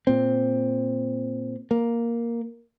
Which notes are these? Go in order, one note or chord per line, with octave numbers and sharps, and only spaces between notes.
A#2 C4
A#3